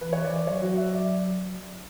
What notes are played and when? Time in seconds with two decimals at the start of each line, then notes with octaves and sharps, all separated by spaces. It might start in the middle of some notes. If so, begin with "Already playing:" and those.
0.01 E3 B4
0.13 C#5
0.24 E3 D5
0.36 D5
0.47 F#3 C#5
0.62 F#4
0.77 E5
0.93 D5